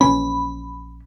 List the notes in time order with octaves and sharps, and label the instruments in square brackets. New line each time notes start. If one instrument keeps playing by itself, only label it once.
[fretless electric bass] A#1 E3 C#4 [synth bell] B5